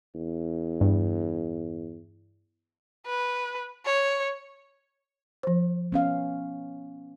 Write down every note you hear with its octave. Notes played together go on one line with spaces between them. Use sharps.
E2
G2
B4
C#5
F3 C5
B3 C#4 F5